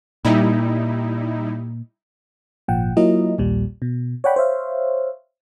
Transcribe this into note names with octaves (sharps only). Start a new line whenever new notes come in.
A#2 G3 D#4 E4
G#1 A#2 F3 F#5 G5
F#3 A#3 E4 F4 A#4 D#5
A#1 D#2 A#2 G3
B2
C#5 D5 F#5 G5 B5
C5 C#5 E5 F5